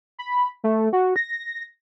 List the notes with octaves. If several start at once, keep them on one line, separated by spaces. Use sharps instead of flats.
B5
A3
F#4
A#6